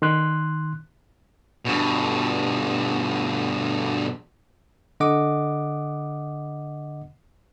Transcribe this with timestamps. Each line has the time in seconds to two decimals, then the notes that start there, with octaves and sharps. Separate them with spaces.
0.02 D#3 C6 F#6
1.65 G2 B2
5.00 D3 D#5 F#5 D6